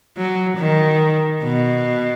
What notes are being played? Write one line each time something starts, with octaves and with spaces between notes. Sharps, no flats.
F#3
D#3
B2